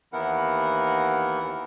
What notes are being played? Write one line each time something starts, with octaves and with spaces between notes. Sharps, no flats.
D#2 E3 B3 E4 A#4 F#5